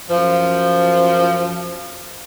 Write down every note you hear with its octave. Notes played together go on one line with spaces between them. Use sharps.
F#2 F3